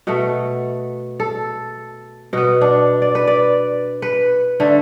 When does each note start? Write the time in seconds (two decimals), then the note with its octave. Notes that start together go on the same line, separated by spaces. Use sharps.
0.07 B2 A3 F#4
1.20 A4
2.33 B2 B3 F#4
2.61 D4
3.02 D5
3.15 B4
3.27 D5
4.02 B4
4.60 D3 A3